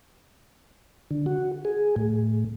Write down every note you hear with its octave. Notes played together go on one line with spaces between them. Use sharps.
D3
F#4
G#4
A2